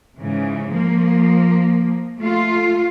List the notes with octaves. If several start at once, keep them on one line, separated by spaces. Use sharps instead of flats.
G#2 C#3 E3
F3 A#3
A3 F4